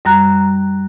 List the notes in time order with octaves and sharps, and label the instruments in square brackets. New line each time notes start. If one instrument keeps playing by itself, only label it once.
[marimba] F#2 G3 A#5 F#6